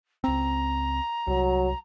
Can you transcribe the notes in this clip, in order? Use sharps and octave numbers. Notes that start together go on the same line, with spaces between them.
C#2 C4 A#5
C2 F#3